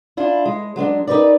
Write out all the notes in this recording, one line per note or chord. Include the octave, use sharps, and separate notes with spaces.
D4 E4 F4
G#3
F#3 G#3 C#4 D4
D#4 G4 A#4 B4 D5